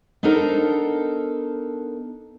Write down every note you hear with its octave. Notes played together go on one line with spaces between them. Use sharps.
B3 D4 D#4 A4 A#4 C5